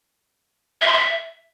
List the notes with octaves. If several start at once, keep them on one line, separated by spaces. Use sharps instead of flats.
E5
C6
E5